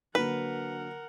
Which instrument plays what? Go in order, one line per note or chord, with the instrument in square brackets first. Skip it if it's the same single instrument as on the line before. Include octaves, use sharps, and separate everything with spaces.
[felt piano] D3 F#3 A#3 [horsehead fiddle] A#4 F#5 [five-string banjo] B4